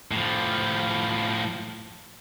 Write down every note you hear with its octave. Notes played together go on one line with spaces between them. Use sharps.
A2 F3